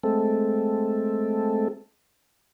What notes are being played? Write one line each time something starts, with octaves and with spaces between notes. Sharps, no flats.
G#3 A3 C4 A4